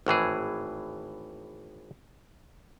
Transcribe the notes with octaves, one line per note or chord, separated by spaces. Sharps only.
G#1 A2 E3 G#4